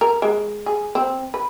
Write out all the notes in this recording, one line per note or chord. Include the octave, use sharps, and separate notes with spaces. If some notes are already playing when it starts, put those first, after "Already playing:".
A#4
G#3
G#4
C4
B4